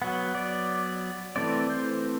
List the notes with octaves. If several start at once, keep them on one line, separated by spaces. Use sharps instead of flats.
F#3 B3 F#5
D5
E3 A3 C4 D5
C5